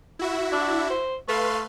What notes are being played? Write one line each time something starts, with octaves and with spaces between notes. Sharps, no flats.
E4 F#4 E5
D4
C5
A3 B4 F5 C6